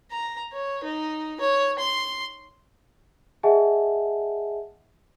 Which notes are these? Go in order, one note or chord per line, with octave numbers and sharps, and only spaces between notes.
A#5
C#5
D#4
C#5
C6
G#4 D#5 E5 F#5 G#5 A5